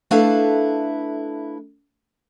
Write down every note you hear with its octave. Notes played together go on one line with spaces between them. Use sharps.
A3 D4 E4 A4 B4 F5